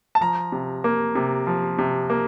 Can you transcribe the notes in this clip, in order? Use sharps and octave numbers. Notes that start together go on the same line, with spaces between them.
A5
F3 A#5
C3
A#3
C3
F3
C3
A#3